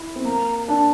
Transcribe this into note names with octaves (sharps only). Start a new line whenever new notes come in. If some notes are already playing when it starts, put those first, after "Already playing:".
Already playing: E4
C4
A#3 A#5
D4 A5